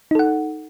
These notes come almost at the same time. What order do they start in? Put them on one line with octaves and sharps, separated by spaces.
D#4 A4 F#5